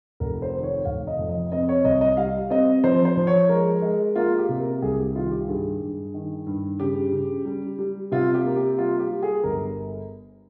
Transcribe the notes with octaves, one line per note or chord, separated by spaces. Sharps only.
F1 A#4
C5
D#3
C#5
F1 F5
D#5
F2
D#5
C4 D#5
C#5
C2 D#5
D#5
G3 F5
C4 D#5
F3 C5
C5
F3
C#5
G#3 A#4
G#3
A#3 F4
G4
C3
A#4
C2 G#4
G4
D#3 F4
G4
G2 G#4
G2
D#3
G2
C#3 G4
C#3
G3
G3
C3 F4
G4
A#3
G4
G3 F4
G4
G3
G#4
G1 A#4